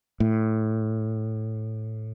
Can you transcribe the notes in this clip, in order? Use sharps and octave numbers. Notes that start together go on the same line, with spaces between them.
A2